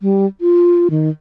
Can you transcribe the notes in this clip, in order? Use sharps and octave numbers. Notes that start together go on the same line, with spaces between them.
G3
F4
D#3